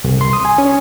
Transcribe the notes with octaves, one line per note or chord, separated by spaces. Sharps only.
C2
C6
D#6
G#5
C#4